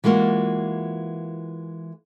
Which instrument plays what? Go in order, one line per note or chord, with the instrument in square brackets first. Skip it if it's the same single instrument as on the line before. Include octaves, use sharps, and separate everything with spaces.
[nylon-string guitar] E3 G#3 A#3 F4 F#4